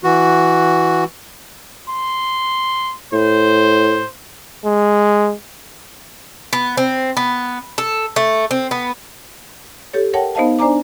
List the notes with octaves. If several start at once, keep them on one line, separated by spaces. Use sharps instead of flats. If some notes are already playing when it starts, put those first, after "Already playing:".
E3 F#4
C6
A2 C5
G#3
B3
C4
B3
A4
A3
C4
B3
G4 A4 C#5
A#4 C#5 F#5 G5 A5
B3 D#4 C5 D#5 F5 A5
D4 C5 D5 G#5 A#5 D6